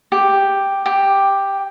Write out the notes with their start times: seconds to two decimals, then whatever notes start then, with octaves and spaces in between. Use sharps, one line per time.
0.12 G4
0.86 G4